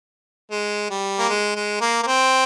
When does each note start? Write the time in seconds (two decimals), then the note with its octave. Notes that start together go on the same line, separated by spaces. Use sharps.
0.51 G#3
0.90 G3
1.19 A#3
1.29 G#3
1.56 G#3
1.81 A#3
2.03 A#3
2.07 C4